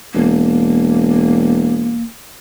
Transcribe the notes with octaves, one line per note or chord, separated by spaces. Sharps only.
E1 A#3